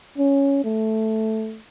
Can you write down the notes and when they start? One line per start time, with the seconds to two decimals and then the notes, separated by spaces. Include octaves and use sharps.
0.18 C#4
0.64 A3